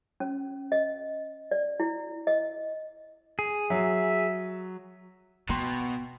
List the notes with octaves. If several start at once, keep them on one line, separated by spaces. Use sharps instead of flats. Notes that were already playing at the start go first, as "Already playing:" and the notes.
C#4
D#5
D5
E4
D#5
G#4
F#3 E5
B2 B3 G5 A#5 C6